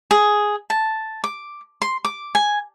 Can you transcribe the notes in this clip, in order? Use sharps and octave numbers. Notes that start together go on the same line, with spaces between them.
G#4
A5
D6
C6
D6
G#5